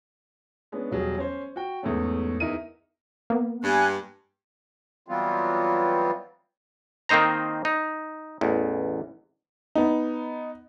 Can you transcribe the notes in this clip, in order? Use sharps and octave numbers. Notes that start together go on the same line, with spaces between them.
G#3 B3 C#4 D4
E1 F#3 G3 G#4
C#4 C5
F#4 G5
E2 G#2 A3 C#4
E2 D#4 E4 A#4 D#7
A#3 B3
G2 G#5 F#6
E3 F#3 G3 B3 C4 F4
D#3 A#3 C4 D#4 C5 A#5
D#4
A1 E2
B3 D#4